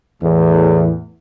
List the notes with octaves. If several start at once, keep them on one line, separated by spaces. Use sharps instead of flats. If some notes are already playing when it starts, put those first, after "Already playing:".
E2 A2